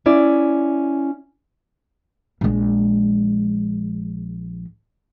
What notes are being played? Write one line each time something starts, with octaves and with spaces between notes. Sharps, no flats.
C#4 E4 D5
A#1 G#3